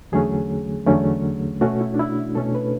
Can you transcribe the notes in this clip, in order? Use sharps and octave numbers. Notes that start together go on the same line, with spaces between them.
E2 D3 F#3 A3 C#4 G#4
E2 D3 F#3 A3 C#4
B2 A3 C#4 F#4
E4
D4
E4
B2 A3 C#4 A4
B4